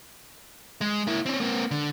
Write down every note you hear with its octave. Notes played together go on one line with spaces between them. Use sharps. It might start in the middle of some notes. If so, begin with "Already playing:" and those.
G#3
A#3 E4
C4 C#4
A#3 C4
D3